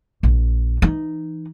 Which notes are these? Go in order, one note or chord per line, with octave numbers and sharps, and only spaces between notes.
A#1
E3 D#4